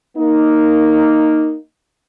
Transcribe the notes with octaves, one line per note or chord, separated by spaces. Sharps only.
A#3 D#4